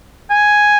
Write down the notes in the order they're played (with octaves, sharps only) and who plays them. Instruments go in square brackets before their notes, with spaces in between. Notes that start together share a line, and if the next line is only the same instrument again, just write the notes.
[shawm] G#5